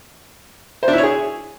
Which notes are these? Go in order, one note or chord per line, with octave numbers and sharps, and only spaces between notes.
C5
D4
E4
C#5
G#4